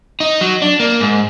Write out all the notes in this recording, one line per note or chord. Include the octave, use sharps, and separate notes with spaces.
D#4
F#3
D4
A#3
G#2